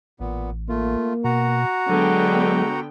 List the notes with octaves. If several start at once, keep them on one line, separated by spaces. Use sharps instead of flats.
A1 A#2 B3
A3 A#3 F4
B2 F#4 F#5 A#5
D3 F#3 G#3 B3 G5